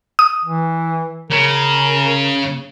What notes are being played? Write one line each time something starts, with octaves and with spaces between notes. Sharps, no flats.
D#6
E3
C#3 A#4